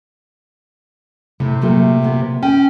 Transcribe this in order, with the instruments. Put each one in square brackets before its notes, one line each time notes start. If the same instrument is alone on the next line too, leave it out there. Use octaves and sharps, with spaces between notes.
[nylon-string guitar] A2 [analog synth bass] C3
[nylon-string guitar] A#2 F#3 A3
A#2 B3
[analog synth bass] C#4 [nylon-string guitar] G5